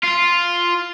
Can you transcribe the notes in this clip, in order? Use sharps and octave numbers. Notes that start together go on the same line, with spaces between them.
F4